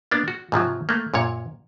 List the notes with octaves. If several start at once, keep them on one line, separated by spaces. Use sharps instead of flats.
A#3 B3 D4
F#4
G#2 C3 F3 F#3
A3 A#3
F#2 A#2 C#5